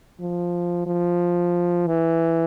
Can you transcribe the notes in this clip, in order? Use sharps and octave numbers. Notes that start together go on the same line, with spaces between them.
F3
F3
E3